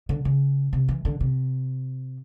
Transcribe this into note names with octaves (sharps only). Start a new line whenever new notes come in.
D3
C#3
C3
E3
D3
C3